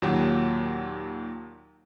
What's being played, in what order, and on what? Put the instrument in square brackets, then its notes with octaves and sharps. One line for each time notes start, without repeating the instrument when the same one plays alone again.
[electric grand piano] D#2 A#2 F#3 G4 F#5